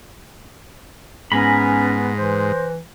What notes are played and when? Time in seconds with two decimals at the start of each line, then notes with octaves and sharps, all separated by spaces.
1.32 G#2 B3 C#4 G#5 A#5 B5
2.17 E3 C5